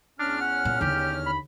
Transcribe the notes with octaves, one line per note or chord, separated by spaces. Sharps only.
E2 C#4 D4 F6
F#5
A#2
D#2 D3 G4
B5